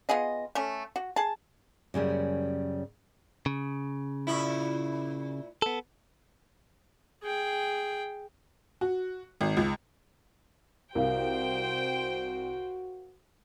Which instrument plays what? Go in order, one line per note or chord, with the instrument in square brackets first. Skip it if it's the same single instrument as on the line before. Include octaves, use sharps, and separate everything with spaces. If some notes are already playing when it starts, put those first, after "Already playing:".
[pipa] B3 F4 G#4 D#5
A3 C#4
F#4
G#4 A5
[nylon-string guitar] F#2 C#3 G3 A#3
[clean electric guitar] C#3
[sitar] A#2 E4
[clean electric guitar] B3 A4
[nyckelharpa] G#4 G5
[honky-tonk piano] F#4
G#1
C#2
[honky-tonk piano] C2 [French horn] F#4 [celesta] A#4 F5 [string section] C5 G5